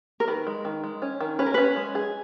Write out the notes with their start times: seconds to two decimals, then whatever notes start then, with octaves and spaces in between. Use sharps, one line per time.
0.20 A#4
0.28 D#3 B4
0.47 G#3
0.65 D#3
0.84 G#3
1.02 C#4
1.20 D#3
1.39 C#4 B4
1.46 A#4
1.54 C#4 B4
1.76 G#3
1.95 G#4